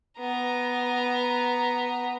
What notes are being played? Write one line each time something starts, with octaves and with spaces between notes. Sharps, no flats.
B3 A#5